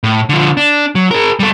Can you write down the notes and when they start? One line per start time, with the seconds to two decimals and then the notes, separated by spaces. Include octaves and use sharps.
0.03 A2
0.29 D3 F3
0.57 D4
0.95 F#3
1.11 G#4 A#4
1.40 G3 A4